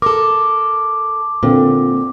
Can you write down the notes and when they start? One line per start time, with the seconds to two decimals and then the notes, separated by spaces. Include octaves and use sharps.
0.02 A4 A#4 D6
1.43 A#2 D3 C4 A#4